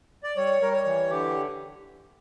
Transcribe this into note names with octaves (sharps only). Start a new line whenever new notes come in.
D5
G3 C#5
G3 A#4
C#5
E3
D3 G4